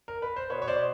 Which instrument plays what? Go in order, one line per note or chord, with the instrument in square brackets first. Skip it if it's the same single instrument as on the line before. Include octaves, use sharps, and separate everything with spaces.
[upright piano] A#4
B4
C5
B2 B4 C#5
C#5
B2 C5 D5